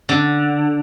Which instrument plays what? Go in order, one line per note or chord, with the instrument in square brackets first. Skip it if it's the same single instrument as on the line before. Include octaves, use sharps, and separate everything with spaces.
[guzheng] D3